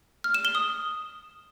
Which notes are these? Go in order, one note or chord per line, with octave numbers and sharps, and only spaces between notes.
F6
E7
G7
D#6